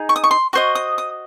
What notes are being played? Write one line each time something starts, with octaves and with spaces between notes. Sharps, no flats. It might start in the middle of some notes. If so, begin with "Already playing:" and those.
Already playing: D#4 G#4 D#5
C#6
D#6
C#6
C6
F#4 C5 D#5 C#6
D#6
D#6